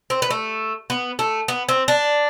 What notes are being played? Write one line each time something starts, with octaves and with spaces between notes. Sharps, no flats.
C4
B3
A3
B3
A3
B3
C4
D4